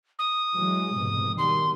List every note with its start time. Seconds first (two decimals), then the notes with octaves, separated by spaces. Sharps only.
0.18 D#6
0.56 E3 F#3 G#3
0.96 F1 G#2 B2
1.38 B2 D#3 G3 C6